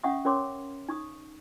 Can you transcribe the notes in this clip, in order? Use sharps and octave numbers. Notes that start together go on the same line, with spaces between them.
C#4 E5 F#5 C#6 D#6
C#4 A#4 C#5 C6 D6
D#4 C#6 D#6